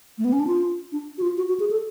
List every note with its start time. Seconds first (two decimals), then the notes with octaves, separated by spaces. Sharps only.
0.18 A3
0.24 B3
0.33 C#4
0.40 D4
0.47 F4
0.92 D4
1.18 F#4
1.22 F4
1.37 F#4
1.49 F#4
1.60 G#4
1.71 A4